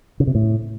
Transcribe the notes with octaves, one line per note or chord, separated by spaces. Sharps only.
C#3
C3
A2